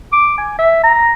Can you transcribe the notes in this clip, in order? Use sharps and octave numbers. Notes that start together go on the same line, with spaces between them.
D6
G#5
E5
A#5